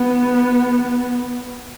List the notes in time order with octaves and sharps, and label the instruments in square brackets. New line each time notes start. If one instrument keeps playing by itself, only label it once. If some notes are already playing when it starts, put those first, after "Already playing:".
Already playing: [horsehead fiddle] B3